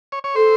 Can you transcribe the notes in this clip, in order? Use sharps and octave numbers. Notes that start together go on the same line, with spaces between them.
C#5
C#5
A4 C5